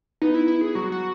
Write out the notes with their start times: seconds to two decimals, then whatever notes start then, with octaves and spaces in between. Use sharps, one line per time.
0.22 B3 D#4
0.34 E4
0.48 E4
0.61 G#4
0.75 F#3 F#4
0.92 F#4